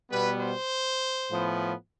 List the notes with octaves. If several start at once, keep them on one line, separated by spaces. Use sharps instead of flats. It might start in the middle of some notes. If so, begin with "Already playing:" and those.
B2 G3 B3 B4
C5
A2 F3 B3